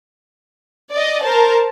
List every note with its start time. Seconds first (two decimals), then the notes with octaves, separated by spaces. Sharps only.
0.92 D5 D#5
1.24 A#4 C5 A5